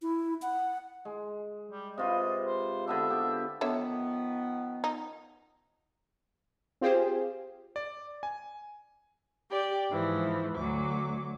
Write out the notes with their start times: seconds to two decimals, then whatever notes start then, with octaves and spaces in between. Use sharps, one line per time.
0.02 E4
0.42 F#5
1.05 G#3
1.71 G3
1.98 C3 F4 B4 D#5
2.45 C5
2.87 D3 B3 D4 E5
3.10 B3 G4
3.61 D3 D#3 F3 B3 C#5 E5
4.84 D#4
6.81 C4 F4 G4 G#4 C5
7.76 D5
8.23 G#5
9.50 G4 D5 G5
9.90 G#2 E3 F3
10.57 D2 F#3 D6